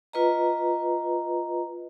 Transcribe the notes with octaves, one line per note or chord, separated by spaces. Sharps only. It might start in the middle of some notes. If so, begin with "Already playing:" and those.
F4 B4 D#5 A#5